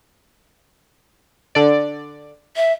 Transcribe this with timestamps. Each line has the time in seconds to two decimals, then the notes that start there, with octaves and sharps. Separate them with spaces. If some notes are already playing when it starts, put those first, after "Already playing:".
1.55 D3 D5
2.56 E5